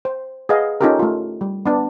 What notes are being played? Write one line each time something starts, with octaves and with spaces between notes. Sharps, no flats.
C5
G#4 B4 D#5 F5 F#5
C#4 D#4 F4 G4 A4 A#4
A3 F4
G3
B3 D4